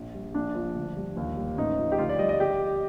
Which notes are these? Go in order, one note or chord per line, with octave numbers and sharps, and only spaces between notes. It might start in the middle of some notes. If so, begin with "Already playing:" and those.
Already playing: A#1
G3
A#1 D4
F3
D2
G3
D#2
G3
A1 D#4
F3
G4
D2 F4
D5
G3 D#5
D#5
G4